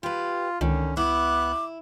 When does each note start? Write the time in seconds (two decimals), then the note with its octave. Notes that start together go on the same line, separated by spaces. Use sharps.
0.03 F4 G4 B4
0.61 C#2 D3 D#3 C#4
0.97 B3 E4 D6 F#6